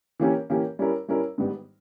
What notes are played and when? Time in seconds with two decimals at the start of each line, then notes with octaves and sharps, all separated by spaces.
0.19 E3 A#3 C#4 G4 A#4
0.50 E3 A#3 C#4 G4 A#4
0.79 G3 C#4 E4 A#4
1.08 G3 C#4 E4 A#4
1.38 G#2 D#3 G3 B3